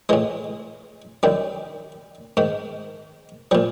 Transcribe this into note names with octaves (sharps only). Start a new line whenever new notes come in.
A2 E3 G#3
F#2 D#3 G3
G#2 D#3
A#2 F3 G3